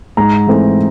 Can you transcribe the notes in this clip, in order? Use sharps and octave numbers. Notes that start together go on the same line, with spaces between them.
G#2 A#5
E3 A3 C4